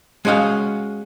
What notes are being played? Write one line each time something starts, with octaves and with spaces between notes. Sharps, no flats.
G#3 C#4 F#4 D#5 F5